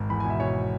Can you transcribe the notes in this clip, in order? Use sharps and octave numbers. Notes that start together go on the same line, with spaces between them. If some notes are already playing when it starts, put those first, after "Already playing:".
Already playing: G#1
E2 B5
G#5
B2 E5
B2 C#5